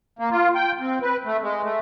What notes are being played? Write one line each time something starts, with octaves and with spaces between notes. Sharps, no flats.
A#3
F4
G5
C4
B4
A3
G#3
A3